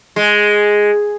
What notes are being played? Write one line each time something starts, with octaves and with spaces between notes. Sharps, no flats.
G#3